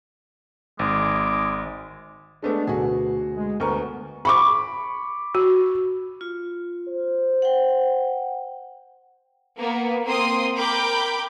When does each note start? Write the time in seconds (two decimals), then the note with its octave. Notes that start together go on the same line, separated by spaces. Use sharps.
0.79 G#1 G#3 D6
2.42 G#3 A3 B3 D4
2.67 D2 B2 F#4 G#4
3.36 G#3
3.60 D2 B3 A#4 C#6
4.25 B5 C#6 D6
5.35 F#4
6.21 F4
6.88 C5
7.42 F#5 G5
9.58 A#3 B3
10.06 A#3 C4 C6 D#6
10.55 A#4 G5 B5 D6 G6